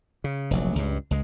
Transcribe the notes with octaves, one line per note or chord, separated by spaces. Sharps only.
C#3
F1 A#1 F#3
C#2 G2
C#2 G#3